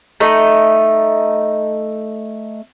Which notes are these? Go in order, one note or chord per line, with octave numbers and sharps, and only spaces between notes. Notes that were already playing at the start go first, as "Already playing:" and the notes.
A3 D#4 D#5